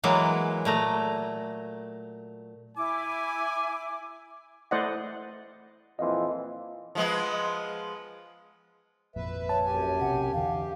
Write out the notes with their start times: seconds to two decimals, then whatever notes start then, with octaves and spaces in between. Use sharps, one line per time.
0.03 E3 F#3 G#3 A#3
0.65 A#2 A3 A#5
2.76 E4 G#5 D6
4.71 A3 E4 C5 D5 D#5 F#5
5.99 F2 A#2 E3 D#5 F5 C6
6.95 F3 G#3 B3
9.16 G#1 F2 A#2 B4 E5
9.49 C#5 A5
9.65 F#2 G4 G#5
10.01 B1 C3 F#5
10.33 E2 D3 G4 F5